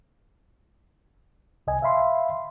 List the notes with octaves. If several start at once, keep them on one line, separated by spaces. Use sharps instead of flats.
C2 D#5 G#5
E5 F5 B5 C6